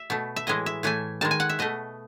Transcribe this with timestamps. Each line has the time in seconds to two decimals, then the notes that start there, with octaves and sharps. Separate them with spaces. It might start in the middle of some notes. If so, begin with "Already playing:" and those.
Already playing: E5
0.10 B2 A3
0.36 E5
0.47 A2 E3 G#3 D#5
0.66 E5
0.83 A2 E3 A3 G#5
1.21 D#3 G#3 A5
1.31 G#5
1.40 F#5
1.49 E5
1.59 B2 A3 D#5